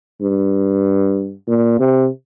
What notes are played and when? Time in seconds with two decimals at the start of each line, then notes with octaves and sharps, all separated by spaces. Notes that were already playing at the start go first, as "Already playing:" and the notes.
0.22 G2
1.48 A#2
1.80 C3